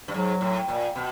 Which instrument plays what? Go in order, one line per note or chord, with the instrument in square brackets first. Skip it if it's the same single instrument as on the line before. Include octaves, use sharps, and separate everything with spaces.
[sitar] G2
[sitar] G#2 [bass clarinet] F#3
[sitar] A2
A#2
B2